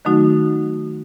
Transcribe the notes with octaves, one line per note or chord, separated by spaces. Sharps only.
D#3 F#3 A3 D#4 F#4